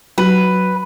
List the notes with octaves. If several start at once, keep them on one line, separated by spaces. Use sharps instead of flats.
F#3 B4